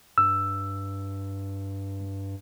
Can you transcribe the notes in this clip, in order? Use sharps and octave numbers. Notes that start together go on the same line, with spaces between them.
G2 E6